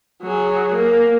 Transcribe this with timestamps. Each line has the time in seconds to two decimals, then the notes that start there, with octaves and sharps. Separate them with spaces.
0.22 F#3 G#4
0.74 A#3